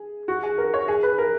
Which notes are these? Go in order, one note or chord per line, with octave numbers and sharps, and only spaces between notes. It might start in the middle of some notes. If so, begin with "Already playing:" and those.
Already playing: G#4
F#4
G#4
A#4
C#5
G#4
B4
A#4